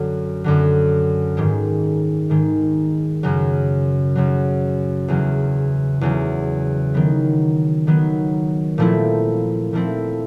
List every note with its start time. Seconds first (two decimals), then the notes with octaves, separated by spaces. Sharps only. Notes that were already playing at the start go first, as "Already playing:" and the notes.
Already playing: F#2 D3 F#3
0.44 F#2 D3 F#3
1.37 G#2 D#3 G#3
2.30 G#2 D#3 G#3
3.23 F#2 C#3 F#3
4.15 F#2 C#3 F#3
5.08 E2 C#3 F#3
6.01 E2 C#3 F#3
6.94 D#3 F#3 B3
7.87 D#3 F#3 B3
8.78 A#2 F3 A3 C4 E4
9.73 A#2 F3 A3 C4 E4